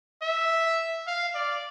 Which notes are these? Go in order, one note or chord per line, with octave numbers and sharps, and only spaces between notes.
E5
F5
D5